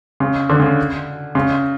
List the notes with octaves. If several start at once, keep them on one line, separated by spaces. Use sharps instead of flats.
C#3
D3
C#3
C#3